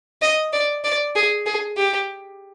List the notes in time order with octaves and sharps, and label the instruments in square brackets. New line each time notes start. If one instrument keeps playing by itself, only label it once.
[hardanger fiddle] D#5
D5
D5
G#4
G#4
G4